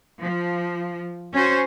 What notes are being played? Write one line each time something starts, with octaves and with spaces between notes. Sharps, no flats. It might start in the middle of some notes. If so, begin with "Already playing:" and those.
F3
C#4 F#4 C5